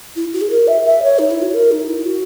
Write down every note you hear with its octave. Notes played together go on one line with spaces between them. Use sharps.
E4
F#4
G#4
A#4
E5
E5
C#5
D#4
E4
F#4
A#4
D#4
E4
F#4